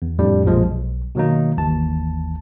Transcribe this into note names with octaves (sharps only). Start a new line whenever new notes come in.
E2
F2 A2 G3 D4
B1 F#2 A#2 F3 G#3
B1
B2 D#3 F#3 A#3 D#4
G1 D#2 E3 A5